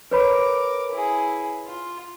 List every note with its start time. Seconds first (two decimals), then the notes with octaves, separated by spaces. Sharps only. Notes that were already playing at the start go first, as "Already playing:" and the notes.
0.11 A#4 B4 C#5 B5 D6
0.92 E4 G#4
1.65 F4